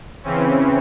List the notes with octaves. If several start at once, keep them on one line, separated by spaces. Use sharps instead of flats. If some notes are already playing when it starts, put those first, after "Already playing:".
C#3 E3 C4 C#4